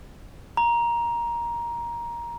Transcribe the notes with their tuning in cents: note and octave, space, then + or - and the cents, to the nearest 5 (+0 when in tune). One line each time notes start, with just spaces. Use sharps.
A#5 +15